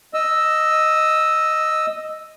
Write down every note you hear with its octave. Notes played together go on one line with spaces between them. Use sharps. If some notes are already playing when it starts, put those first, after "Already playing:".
D#5 E6